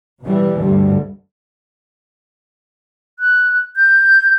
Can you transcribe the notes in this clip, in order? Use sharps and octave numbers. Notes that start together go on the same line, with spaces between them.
B2 E3 G3
D2 G2 G3
F#6
G6